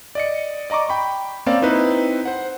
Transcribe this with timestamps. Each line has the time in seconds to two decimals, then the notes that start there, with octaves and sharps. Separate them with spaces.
0.15 D5 D#5 C#7
0.70 D5 D#5 A#5 C#6 D6
0.89 G5 B5 C#6
1.46 A#3 C4 C#4 D5 F5
1.62 C4 D#4 E4 B4
2.25 C5 F#5